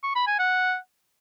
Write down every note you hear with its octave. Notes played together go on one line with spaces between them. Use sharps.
C#6
B5
G#5
F#5